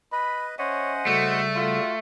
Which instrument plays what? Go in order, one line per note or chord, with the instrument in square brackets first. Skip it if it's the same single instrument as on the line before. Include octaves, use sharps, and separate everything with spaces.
[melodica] B4 D#5 [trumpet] B5
[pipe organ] C#4 E5 G#5 [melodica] C5 D#5 F#5 [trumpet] C#5
[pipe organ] C#3 G3 A4 [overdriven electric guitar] A3 [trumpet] F#4
[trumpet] F4 [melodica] F#4